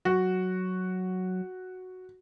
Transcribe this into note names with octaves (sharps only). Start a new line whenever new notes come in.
F#3 F#4